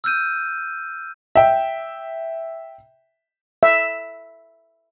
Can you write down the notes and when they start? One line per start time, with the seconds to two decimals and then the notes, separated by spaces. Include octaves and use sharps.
0.04 E6 F6 G6 D#7
1.35 E5 G5
3.63 E5